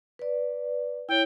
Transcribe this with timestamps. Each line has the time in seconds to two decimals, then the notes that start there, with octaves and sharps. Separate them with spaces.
0.19 B4 D5
1.09 E4 C#5 G5